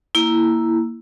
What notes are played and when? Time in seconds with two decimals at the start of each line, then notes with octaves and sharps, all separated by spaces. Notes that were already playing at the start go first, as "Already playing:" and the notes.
0.15 A#3 E4